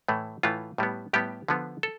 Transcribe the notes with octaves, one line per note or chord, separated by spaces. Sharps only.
A2 E3 A3
A2 E3 A3 F4
A2 G3 B3
A2 G3 B3 G4
D3 F3 B3
A4